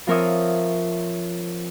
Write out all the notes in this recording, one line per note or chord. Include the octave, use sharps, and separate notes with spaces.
F3 C4 A#4 C#5 E5 D#6